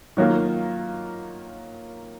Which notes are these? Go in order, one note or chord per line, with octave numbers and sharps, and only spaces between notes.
D#3 F#3 A#3 F4